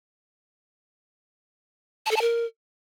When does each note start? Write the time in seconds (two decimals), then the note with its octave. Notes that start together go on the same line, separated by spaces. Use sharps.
2.06 A5
2.11 A4
2.16 A5
2.21 A#4